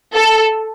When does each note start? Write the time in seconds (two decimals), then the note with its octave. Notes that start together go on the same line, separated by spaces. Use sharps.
0.15 A4